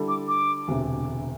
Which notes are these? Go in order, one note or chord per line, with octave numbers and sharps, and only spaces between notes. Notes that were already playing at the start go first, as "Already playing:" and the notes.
Already playing: D3 G3 E4 A4
D6
D6
E1 D2 C3